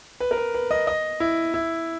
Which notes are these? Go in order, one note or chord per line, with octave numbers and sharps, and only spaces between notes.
B4
A#4
B4
B4
D#5
D#5
E4
E4